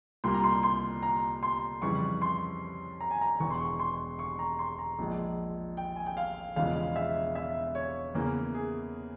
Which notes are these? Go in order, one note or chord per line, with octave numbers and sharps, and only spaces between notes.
C2 A#2 G3 A#3 C6
A#5
C6
C6
A#5
C6
F2 C#3 E3 G3 C#6
C6
A#5
G#5
A#5
E1 E2 E3 C#6
C6
C#6
C6
C#6
A#5
C6
A#5
A#1 A#2 F3 G#3
G5
G#5
G5
F5
E1 E2 C#3 F3 G#3 F5
E5
E5
C#5
E2 C#3 E3 A#3
G#4